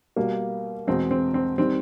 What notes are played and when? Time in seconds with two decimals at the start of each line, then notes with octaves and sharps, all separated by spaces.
0.16 B2 G3 A#3
0.87 E2 B2 G#3 C4
1.11 C4
1.34 C4
1.58 D#3 G3 C4